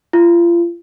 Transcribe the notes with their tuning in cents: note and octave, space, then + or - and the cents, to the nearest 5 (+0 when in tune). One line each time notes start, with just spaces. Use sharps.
F4 -35